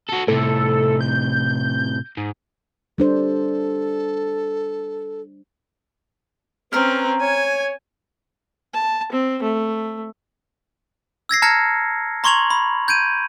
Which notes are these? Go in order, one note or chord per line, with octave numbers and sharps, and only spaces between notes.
F#4 A4
A2 C3 A4
G6
G#2
G3 D4 A4 C5
C4 C#4 A#4 B4 F6
C#5 G#5
A5
C4
A3
E6 G#6 A#6 C7
A5 A#5 F6 G#6 A#6 C#7
A#5 C6 C#6 G#6 F7 F#7
B5
G6 G#6 D7 D#7